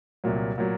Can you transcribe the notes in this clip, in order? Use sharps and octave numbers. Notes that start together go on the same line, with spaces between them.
C2 A#2 F#3
A#2 F#3